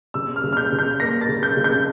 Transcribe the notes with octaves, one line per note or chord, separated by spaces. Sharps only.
C#3 E6
F6
C#3
F6
G6
C#3
G6
A#3 A#6
A6
C#3
G6
C#3
G6